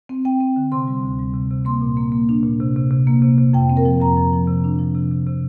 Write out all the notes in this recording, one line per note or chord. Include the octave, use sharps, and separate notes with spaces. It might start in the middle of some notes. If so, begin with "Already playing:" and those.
C4
C4 G5
C4
D3
C3 C6
G3
D2
G3
C3
C3
A#3 C6
A#2
A#3
A#3
D4
A#2
C3
C3
C3
A#3
C3
C3
F2 G5
C4
A#4
F3
F2 A#5
F3
F3
C3
D4
F3
C3
C3
C3